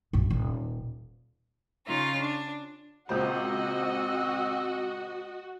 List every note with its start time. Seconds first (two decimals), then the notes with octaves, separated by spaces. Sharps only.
0.13 A#1 F#2
0.31 D#1
1.88 C#3 D#4 F4
2.22 D4
3.09 C#2 A#2 C4 F#4 C5 D#5 F#5